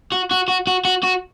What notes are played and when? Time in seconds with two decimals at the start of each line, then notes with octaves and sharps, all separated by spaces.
0.12 F#4
0.31 F#4
0.48 F#4
0.67 F#4
0.85 F#4
1.03 F#4